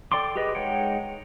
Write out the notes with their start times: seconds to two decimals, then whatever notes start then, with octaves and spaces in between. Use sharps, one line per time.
0.12 A4 D5 G5 C6 D6
0.36 G4 G#4 B4 D#5
0.55 G#3 D#4 C#5 F#5 G5